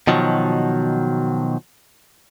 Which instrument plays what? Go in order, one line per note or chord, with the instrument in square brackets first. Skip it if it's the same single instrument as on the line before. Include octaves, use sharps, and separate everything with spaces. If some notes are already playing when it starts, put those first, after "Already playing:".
[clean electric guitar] B2 D#3 F3 F#3